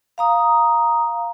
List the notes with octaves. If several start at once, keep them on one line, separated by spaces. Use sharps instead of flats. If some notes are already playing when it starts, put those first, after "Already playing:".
F5 A#5 D#6